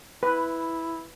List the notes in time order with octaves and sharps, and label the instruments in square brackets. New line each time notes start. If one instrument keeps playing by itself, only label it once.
[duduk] E4 [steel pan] B4